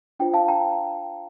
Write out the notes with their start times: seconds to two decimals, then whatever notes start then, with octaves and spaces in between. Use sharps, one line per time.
0.20 D4 F4 C5 G5
0.34 F5 A5
0.48 G5 A#5